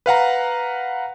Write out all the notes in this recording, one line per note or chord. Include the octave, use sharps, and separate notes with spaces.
B4 F5 F#5 A#5